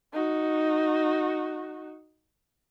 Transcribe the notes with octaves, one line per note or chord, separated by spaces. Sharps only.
D#4 F#4